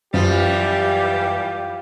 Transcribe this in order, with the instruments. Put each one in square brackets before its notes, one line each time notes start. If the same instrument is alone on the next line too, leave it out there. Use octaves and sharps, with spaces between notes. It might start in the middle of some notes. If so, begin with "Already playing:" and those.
[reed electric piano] F#2 [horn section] E3 G3 [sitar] F3 [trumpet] G4